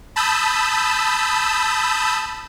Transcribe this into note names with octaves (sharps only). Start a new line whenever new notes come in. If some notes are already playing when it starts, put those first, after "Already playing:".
A5 B5 D#6 E6 G6